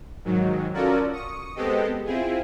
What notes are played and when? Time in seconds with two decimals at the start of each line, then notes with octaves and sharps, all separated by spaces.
0.25 G#2 D#3 F#3
0.74 C#4 F4 F#4 A4 A#4 D5
1.11 C#6 D#6
1.55 G#3 B3 C4 G4 A4 D#5
2.05 C4 E4 F4 G#4